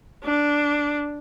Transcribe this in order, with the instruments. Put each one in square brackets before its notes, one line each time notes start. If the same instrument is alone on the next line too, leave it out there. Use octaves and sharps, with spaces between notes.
[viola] D4